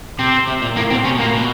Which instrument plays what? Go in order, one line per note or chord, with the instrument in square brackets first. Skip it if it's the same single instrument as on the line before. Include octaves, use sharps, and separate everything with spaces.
[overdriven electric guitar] C3 [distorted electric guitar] C4
[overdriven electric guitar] C3
A#2
[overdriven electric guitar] A2 [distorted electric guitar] A#3
[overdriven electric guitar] B2 [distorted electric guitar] C4
[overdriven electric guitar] C3 [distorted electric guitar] C#4
[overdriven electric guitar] B2
[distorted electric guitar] A#3
[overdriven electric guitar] A#2
B2